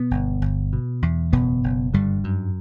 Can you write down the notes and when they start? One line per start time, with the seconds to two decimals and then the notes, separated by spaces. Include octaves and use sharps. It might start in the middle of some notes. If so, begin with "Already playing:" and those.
Already playing: B2 B3
0.11 G1
0.42 G1
0.73 B2
1.02 E2
1.32 F#1 B2 B3
1.64 F#1
1.94 G2 D3 G3
2.24 F#2